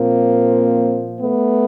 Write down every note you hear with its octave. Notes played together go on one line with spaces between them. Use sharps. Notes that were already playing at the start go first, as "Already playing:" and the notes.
Already playing: A#2 F3 A#3 C4
A3 B3